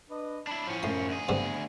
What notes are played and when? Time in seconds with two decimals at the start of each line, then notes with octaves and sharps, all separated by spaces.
0.10 D4 B4 D#5
0.47 D4 E4 A5 B5
0.67 A2 F3 C#4
0.83 F#2 A2 C6
1.08 D2 G#4
1.29 G2 D3 B3 C4